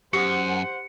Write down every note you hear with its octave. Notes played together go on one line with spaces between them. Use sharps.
F#2 G4 A4 C5 F#5 C#7